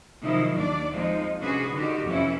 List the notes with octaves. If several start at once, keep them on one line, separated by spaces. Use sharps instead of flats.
C3 D#3 F3 F#3 D#4 E4
D#2 D4 D5
F3 G#3 C4 D#4
C3 C#4 D4 F#4 G#4 B4
D3 D#3 F#4 G4
F2 C3 E3 C#4 E4